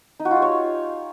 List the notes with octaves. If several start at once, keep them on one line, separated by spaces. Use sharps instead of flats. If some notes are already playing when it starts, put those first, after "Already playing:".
D#4
F#4
F4
G4
C#5